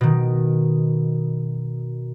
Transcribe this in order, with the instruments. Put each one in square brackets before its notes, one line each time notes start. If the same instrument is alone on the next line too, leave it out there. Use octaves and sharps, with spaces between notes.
[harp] B2 D#3